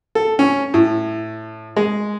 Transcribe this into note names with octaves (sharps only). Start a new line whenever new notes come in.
A4
C#4
A2
G#3